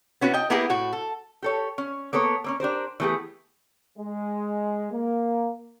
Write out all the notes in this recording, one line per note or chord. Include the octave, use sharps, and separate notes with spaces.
B3 C#4 E4 F#4
D#5 G5
A#3 B3 E4 G4 G#4 A#4
A2 F#4
A4
G4 A4 C#5
C#4
A#3 B3 A4 C#5
A#3 C4 C#4
D4 G4 A#4 C5
E3 A3 B3 G4 G#4
G#3
A#3